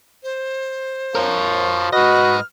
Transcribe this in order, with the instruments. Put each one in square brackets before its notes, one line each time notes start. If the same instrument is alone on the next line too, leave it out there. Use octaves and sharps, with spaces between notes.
[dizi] C5
[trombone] F3 [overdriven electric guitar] A#4 C#5
[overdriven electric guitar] G#2 D#5 [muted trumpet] F#4 [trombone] B4 [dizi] F6